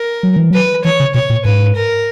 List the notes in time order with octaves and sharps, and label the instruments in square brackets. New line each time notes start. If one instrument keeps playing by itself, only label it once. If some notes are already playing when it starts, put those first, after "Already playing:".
Already playing: [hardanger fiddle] A#4
[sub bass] F#3
E3
[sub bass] F#3 [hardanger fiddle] B4
[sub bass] E3 [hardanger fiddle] C#5
[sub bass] C#3
[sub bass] B2 [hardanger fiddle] C#5
[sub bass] A#2
[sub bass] G#2 [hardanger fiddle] B4
[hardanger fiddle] A#4